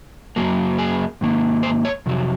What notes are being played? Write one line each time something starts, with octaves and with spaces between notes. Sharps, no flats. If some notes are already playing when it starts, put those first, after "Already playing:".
F#2 C#3 F#3 A#3
G#4
G#2 D#3 A#3
C5
C#5
F2 C3 F#3